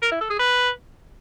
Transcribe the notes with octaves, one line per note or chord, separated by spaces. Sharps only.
A#4
E4
A4
G#4
B4